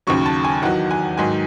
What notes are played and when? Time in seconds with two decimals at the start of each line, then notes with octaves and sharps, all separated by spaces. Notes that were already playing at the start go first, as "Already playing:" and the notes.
0.07 D#2 C#3 F#3 C#6
0.26 A5
0.45 G#5
0.62 E2 D#3 F#3 F#5
0.91 G#5
1.18 G#2 D#3 F#3 G#5